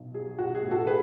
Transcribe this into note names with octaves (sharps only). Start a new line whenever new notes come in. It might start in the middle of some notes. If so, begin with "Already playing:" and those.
Already playing: B1
F#3 G#4
B1 F#4
G#4
A2
F#4 A4
G#4 B4